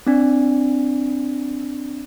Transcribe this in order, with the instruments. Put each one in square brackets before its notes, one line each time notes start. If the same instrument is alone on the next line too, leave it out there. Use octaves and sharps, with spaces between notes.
[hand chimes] C4 D4